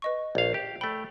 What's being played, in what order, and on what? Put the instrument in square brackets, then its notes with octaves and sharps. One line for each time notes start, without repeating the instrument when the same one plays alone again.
[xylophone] B4 D#5 C#6
[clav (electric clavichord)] A#1 F5
G4
[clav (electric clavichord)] A3 G5 [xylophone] B5